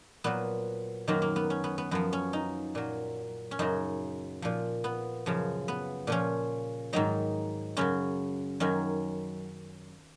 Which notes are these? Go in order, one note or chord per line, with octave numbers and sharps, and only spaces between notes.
A#2 F#3 B3
F#2 D#3 F#3 A#3
A#3
B3
C#4
B3
B3
F#2 F3 B3
C#4
D#4
A#2 F#3
C#4
F#2 C#3 F#3 D#4
A#2 F3
B3
F#2 C#3 F3
B3
A#2 F3 C#4
G#2 D#3 F#3 D#4
F#2 C#3 F#3 C#4
F#2 D#3 F#3 C#4